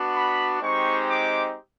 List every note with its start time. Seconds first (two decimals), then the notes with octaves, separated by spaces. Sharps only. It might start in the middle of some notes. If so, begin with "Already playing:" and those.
Already playing: B3 D4 F#4
0.14 B5
0.61 G#3 C4 D#4 G4 C#6
1.08 D6